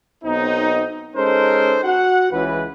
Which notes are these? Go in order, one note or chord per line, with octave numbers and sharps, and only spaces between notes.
B1 B3 C4 D#4
G#3 C#4 D#4 A4 A#4 C5
F#4 F#5
C#2 E3 B4